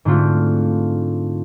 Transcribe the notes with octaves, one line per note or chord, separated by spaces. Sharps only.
G#2 D3 A3 C4 F4 F#4